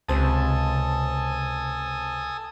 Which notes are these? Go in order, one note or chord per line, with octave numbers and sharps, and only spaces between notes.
C#2 C3 A4 C5 G#5 A5 D#6